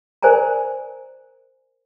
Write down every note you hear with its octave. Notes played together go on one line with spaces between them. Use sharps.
A#4 C5 D5 G#5 A#5